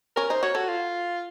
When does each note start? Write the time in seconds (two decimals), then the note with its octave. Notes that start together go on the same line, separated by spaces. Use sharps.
0.16 C#4 A#4
0.29 D#4 C5
0.43 F#4 C#5
0.55 F#4 A4
0.68 F4